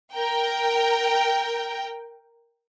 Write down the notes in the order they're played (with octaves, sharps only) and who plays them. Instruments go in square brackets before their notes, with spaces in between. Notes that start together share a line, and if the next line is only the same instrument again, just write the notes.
[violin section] A#4 G5